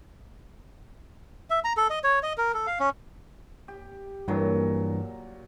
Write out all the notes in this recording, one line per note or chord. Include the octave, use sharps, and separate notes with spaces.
E5
A#5
A4
D#5
C#5
D#5
A#4
A4
F5
C#4
G4
G2 A#2 E3 F#3